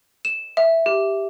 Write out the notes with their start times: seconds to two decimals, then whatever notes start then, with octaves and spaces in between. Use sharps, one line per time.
0.25 E7
0.57 E5
0.86 G4